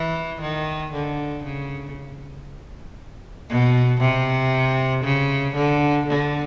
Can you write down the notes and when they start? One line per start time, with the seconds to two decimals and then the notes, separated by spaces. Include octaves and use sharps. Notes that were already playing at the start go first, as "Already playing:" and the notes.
Already playing: E3
0.41 D#3
0.92 D3
1.43 C#3
3.49 B2
4.01 C3
5.04 C#3
5.55 D3
6.06 D3